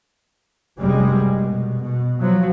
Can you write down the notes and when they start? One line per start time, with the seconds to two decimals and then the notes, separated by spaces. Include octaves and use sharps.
0.79 F1 F#2 G3 G#3
1.39 B2
1.80 B2
2.20 F3 F#3